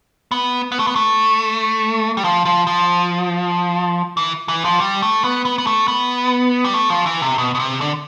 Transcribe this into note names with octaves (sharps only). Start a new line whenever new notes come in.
B3
B3
A3
B3
A3
G3
F3
F3
F3
E3
E3
F3
G3
A3
B3
B3
B3
A3
B3
G3
A3
F3
E3
C3
B2
B2
C3
D3